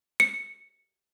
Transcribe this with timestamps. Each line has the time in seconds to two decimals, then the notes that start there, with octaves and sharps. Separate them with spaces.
0.20 C#7